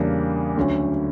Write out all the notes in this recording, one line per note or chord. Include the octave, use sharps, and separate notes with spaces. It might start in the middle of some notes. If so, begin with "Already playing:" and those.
Already playing: E2 C#3 G3 A#3 D4
D2 D3 F#3 C#4